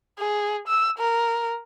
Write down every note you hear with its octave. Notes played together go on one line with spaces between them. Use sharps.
G#4
E6
A#4